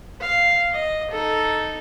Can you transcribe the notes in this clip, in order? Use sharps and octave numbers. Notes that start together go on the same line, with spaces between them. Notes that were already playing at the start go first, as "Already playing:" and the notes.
F5
D#5
D#4 A4